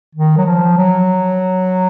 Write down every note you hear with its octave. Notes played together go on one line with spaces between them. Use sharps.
D#3
F#3
F3
F#3